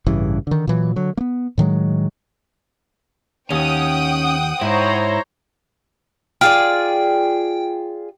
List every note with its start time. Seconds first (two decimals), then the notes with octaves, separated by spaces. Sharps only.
0.06 A1 G2 C#3 E3
0.47 D3 D#3
0.67 A#2 E3 F#3
0.96 D3 F#3
1.17 A#3 B3
1.58 A2 D#3 F#3 G#3
3.51 D#2 C#4 F#5 G5 D#6
4.61 G#2 E4 C5 C#5 A#5
6.41 F4 G#4 D5 G5